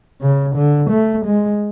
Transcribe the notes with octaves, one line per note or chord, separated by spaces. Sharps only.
C#3
D3
A3
G#3